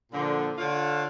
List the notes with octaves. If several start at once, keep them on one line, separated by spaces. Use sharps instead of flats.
A#2 D3 F3
D3 F4 C#5